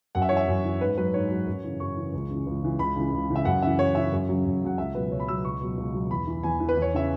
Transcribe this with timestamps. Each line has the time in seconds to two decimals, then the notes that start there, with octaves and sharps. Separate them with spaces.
0.15 F#2 F#5
0.22 E5
0.29 E3 C#5
0.37 E5
0.48 F#2
0.65 E3
0.81 G#2 B4
0.97 F#3 B4
1.14 G#2 C#5
1.31 F#3
1.47 F#2
1.64 C#3 E3
1.80 F#2 C#6
1.97 C#3 E3
2.13 C#2
2.30 C#3 E3
2.47 C#2
2.63 C#3 E3
2.79 C#2 B5
2.96 C#3 E3
3.13 C#2
3.30 C#3 E3
3.36 E5
3.45 F#2 F#5
3.62 C#3 E3 E5
3.79 F#2 C#5
3.95 C#3 E3 E5
4.12 F#2
4.29 C#3 F#3
4.45 F#2
4.62 C#3 F#3 F#5
4.78 C#2 E5
4.95 B2 F#3 B4
5.11 C#2 C#5
5.20 B5
5.28 B2 F#3 E6
5.44 C#2 C#6
5.61 B2 F#3
5.78 C#2
5.94 B2 F#3
6.11 E2 B5
6.27 E3
6.43 E2 G#5
6.60 E3
6.69 B4
6.77 E2
6.82 C#5
6.94 C#3 E3 E5